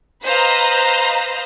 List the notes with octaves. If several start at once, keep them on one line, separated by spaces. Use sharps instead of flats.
B4 C5 D#5 F5 A#5